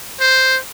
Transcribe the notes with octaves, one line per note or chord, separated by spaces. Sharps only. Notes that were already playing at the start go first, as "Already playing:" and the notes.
C5